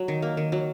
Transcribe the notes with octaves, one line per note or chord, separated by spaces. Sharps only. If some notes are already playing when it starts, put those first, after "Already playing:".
Already playing: F#3
D#3
A#3
D#3
F#3